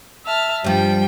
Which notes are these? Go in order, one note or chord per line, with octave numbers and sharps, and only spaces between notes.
E5 A5 F6
G2 F3 G3 G5